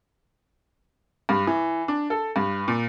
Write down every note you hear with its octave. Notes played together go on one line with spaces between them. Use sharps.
G2
E3
D4
A4
G2
A#2